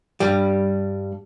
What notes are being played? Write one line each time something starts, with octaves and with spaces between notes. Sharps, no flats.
G2 G3